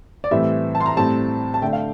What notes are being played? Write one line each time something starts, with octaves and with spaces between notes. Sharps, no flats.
D5
A2 E3 G3 C4 E5
A5
C6
A#5
A2 G3 C4 A5
A5
D3 A3 D4 G5
F5